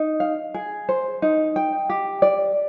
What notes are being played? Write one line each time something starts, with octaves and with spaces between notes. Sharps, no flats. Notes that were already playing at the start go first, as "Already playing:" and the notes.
Already playing: D#4
F5
G#4
C5
D#4
G5
G4
D5